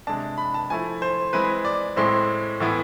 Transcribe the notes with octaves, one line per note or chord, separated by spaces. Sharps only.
C3 G#3 D4 A5
B5
A5
F3 A3 E4 G#5
C5
E3 G#3 C4 E4 B4
D5
A2 G#3 C4 E4 C6
A2 E3 B3 E4